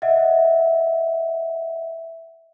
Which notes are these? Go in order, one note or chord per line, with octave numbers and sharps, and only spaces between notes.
D#5 E5 F#5